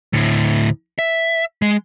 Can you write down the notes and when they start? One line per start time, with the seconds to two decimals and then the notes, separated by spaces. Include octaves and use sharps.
0.13 D2 A2
0.99 E5
1.62 G#3